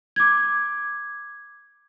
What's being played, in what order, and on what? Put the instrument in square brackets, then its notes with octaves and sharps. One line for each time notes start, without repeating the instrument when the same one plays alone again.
[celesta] D6 G#6